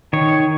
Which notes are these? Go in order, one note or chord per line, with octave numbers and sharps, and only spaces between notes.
D#3 C#5